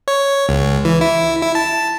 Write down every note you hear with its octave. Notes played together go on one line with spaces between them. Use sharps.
C#5
C#2
E3
E4
E4
A5